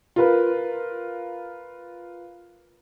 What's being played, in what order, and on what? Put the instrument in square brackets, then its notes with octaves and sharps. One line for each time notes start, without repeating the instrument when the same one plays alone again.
[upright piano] F4 A#4 B4